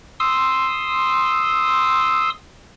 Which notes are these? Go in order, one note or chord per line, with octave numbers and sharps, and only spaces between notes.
C6 D#6 E6